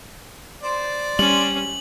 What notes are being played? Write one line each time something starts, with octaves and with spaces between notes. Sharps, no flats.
C5 D5
G3 C#4 F#7